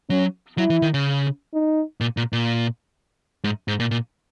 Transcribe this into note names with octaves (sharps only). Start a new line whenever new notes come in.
F#3 C#4
F#3 E4
E3
D#3
C#3
D#4
A#2
A#2
A#2
G#2
G#2
A#2
A#2